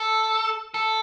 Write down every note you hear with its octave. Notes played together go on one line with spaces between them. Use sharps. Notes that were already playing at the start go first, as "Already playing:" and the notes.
Already playing: A4
A4